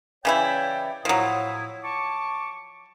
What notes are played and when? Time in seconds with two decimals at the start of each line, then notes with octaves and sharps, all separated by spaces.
0.25 C#3 E3 E4 C#5 D5 G5
1.05 A2 F3 F#3 E4 D#6
1.84 A5 C#6 D6